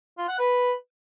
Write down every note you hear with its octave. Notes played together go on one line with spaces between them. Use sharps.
F4
F#5
B4